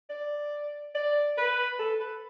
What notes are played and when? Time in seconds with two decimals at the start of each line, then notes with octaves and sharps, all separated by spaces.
0.10 D5
0.95 D5
1.38 B4
1.79 A4
2.00 B4